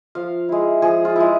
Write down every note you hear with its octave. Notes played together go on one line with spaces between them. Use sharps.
F3 F5
G#3 E4
F3 G#4
F4
G#3 E4